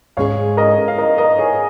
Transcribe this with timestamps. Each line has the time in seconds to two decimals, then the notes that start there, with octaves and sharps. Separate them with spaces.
0.17 G#2 G#3 C#4 G#4 C#5 F5
0.57 A#4 D#5
0.88 F5
0.98 A#4 D#5
1.18 A#4 D#5
1.38 G#4 C#5